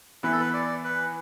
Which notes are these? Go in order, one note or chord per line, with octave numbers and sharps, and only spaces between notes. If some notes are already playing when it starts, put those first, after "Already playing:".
E3 B3 E4 B4
A4
B4
D5
B4